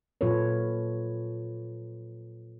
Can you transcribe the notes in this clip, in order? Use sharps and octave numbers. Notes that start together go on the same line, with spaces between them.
A#2 F#3 F4 A4 B4 C#5